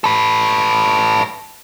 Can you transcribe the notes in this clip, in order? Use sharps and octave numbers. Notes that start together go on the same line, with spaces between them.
A4 B4